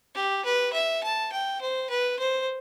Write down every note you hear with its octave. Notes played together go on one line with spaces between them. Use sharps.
G4
B4
E5
A5
G5
C5
B4
C5